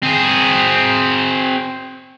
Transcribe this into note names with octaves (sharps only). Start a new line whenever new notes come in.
C4 G#4